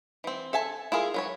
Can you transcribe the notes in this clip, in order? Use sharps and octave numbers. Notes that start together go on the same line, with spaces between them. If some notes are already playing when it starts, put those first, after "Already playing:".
E3 C4
A4 E5 G#5 A5
E4 F4 G#4 A#4
F#3 B4 C#5